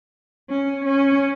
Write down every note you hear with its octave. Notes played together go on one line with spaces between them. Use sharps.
C#4
C#4